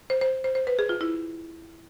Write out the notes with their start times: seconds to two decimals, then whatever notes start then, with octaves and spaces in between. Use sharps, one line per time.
0.10 C5
0.21 C5
0.44 C5
0.55 C5
0.67 B4
0.79 G#4
0.89 F4
1.01 E4